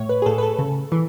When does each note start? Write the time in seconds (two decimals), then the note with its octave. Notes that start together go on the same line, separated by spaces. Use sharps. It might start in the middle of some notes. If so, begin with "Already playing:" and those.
Already playing: A2 C#5
0.09 B4
0.22 G#4
0.26 A2 A4
0.38 B4
0.43 A4
0.59 C#3
0.92 E3